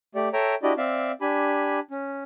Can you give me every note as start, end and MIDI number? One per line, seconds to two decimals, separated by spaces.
0.15 0.29 57
0.15 0.29 67
0.15 0.29 74
0.33 0.55 69
0.33 0.55 73
0.33 0.55 76
0.33 0.55 79
0.33 0.55 82
0.63 0.73 62
0.63 0.73 64
0.63 0.73 66
0.63 0.73 67
0.63 0.73 74
0.63 0.73 75
0.77 1.12 60
0.77 1.12 74
0.77 1.12 76
0.77 1.12 77
1.21 1.79 62
1.21 1.79 67
1.21 1.79 80
1.21 1.79 83
1.91 2.24 61